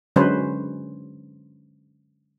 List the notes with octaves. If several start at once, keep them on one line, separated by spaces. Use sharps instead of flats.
D3 F#3 G#3 C#4 B4 C5